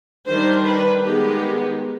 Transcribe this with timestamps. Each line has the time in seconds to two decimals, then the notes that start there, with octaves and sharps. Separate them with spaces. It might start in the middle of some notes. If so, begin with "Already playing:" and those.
0.27 D#3 G3 D4 C5
0.66 B4
1.05 D#3 G#3 B3 G4